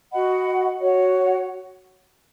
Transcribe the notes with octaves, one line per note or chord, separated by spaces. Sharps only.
F#4 D#5 F#5 B5
F#4 C#5 F#5